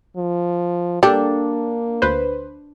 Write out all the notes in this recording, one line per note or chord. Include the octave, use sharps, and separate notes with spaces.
F3
A#3 D4 G4 A4
D2 B4 C5